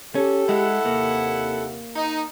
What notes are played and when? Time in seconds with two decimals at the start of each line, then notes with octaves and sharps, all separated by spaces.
0.15 C#4 G4 A4
0.49 G#3 E4 F#5
0.85 D#2 C3 A#3
1.96 D#4